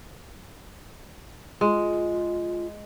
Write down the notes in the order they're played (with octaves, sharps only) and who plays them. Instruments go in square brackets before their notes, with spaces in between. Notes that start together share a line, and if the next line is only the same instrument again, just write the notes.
[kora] G#3 [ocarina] F4